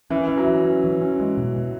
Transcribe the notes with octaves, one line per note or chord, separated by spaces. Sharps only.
E3 C#4
E3 C#4
F#3
E3
C#4
E3
C#4
G#3
B2
B2